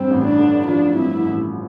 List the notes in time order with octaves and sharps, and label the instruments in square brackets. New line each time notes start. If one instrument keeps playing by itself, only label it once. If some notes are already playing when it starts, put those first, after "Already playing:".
Already playing: [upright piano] G2 [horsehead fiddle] C4
[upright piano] A1
[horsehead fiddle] D4
[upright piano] D3
[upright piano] F3 [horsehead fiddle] D4
[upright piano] G2 [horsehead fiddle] E4
[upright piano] A1